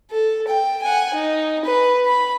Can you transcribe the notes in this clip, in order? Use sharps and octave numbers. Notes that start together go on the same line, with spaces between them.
A4
G5
F#5 G#5
D#4
B4
B5